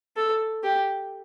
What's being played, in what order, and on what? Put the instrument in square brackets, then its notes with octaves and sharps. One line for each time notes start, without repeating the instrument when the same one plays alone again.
[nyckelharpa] A4
G4